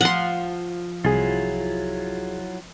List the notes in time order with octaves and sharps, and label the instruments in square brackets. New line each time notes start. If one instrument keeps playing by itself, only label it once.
[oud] F3 [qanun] F#5 C6
[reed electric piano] C2 G#4 [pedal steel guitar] F#3 E4 F4